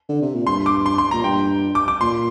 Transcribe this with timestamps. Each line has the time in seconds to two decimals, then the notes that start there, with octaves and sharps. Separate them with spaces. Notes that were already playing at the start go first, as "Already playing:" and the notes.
0.09 D3
0.22 C3
0.34 A#2
0.47 G2 C6
0.66 D6
0.86 C6
0.98 C6
1.11 A#2 A#5
1.24 G2 G5
1.75 D6
1.88 D6
2.01 A#2 C6